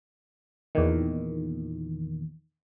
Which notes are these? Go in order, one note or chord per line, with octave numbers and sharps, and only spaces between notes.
E2 A#2 D#3